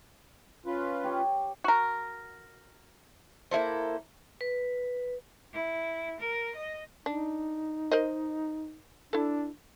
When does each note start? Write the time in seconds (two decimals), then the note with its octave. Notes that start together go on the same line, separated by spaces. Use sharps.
0.66 C#4 F4 B4
1.04 G4 C#5
1.64 F#4 A#4
3.51 A#3 E4 A4 C5
4.41 B4
5.54 E4
6.20 A#4
6.55 D#5
7.06 D4 D#4
7.91 A#4 C5 D#5
9.13 D4 E4 A4